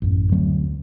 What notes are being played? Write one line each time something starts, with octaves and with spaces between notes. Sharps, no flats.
A1 F#2
D2 F#3 A3 C4